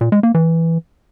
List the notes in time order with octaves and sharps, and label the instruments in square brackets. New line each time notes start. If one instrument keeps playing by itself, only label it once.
[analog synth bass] A#2
G#3
A#3
E3